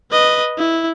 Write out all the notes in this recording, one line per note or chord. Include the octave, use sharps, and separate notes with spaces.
B4 D#5
E4